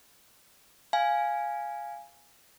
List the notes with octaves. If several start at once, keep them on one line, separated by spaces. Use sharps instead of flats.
F5 G#5